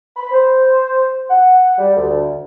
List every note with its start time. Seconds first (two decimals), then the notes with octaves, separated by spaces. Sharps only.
0.16 B5
0.31 C5
1.30 F#5
1.78 G3
1.97 D2